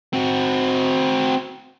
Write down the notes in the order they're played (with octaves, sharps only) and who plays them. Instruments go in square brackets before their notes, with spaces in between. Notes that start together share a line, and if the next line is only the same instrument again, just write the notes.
[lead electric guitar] C4 F#4